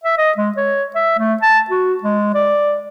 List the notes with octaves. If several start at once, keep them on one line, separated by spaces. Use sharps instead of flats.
E5
D#5
G#3
C#5
E5
A3
A5
F#4
G#3
D5